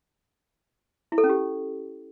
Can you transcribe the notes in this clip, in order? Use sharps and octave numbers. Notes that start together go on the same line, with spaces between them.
E4
A4
C#4
G4